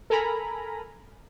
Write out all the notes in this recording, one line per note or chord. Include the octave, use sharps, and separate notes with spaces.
A4 A#4 G#5 A#5 B5